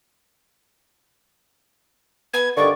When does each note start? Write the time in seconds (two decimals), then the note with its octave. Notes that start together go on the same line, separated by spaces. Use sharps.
2.34 B3 G#6
2.57 G2 D3 D#3 D5 C#6